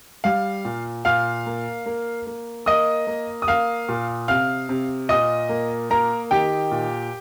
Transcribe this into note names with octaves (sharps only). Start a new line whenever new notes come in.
G3 F5
A#2
A#2 F5 F6
A#3
A#3
A#3
A#3 D#5 D#6
A#3
D#6
A#3 F5 F6
A#2
C3 F5 F6
C3
A#2 D#5 D#6
A#3
A#3 A#4 A#5
D#3 G4 G5
A#2